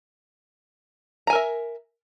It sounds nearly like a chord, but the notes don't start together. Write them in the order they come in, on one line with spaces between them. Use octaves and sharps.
A#5 G#5 A#4 E5